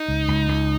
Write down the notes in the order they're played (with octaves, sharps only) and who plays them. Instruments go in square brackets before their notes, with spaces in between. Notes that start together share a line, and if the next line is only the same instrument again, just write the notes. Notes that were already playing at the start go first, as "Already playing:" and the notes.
Already playing: [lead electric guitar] D#4
[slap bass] C#2
C#2
C#2